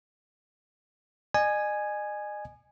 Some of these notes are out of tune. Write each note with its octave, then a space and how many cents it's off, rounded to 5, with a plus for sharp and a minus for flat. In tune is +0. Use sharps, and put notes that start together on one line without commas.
D#5 -40 G#5 +0